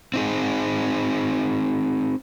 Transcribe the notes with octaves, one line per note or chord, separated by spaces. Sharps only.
C4 D#4 G#4